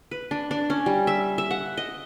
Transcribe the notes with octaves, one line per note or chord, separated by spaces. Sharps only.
B4
D4
D4
C#4
G3
E5
E5
F#5
D#5